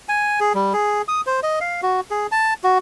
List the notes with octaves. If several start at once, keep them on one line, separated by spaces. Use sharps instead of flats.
G#5
G#4
G3
G#4
D#6
C5
D#5
F5
F#4
G#4
A5
F#4